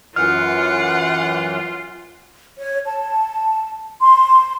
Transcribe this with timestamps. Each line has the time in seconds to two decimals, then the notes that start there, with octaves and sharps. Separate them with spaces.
0.16 F#2 E3 F4 F#5 F6
2.59 C#5
2.86 A5
4.01 C6